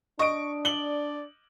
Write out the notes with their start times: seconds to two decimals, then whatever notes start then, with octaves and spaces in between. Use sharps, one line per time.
0.19 D4 D#5 C#6 D#6 D7
0.65 D5 F#7 G7